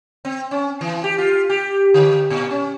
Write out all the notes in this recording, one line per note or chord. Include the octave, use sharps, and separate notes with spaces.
C4
C#4
E3
G4
F4
G4
D3
A#2
C#4